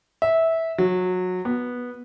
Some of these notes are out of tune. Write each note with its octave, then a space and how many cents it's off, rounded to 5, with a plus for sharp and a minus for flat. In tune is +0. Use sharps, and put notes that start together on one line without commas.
E5 -15
F#3 -20
B3 -10